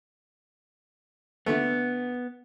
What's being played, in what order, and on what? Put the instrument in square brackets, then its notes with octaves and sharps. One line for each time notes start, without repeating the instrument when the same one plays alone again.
[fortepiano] D3 A3 [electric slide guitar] B3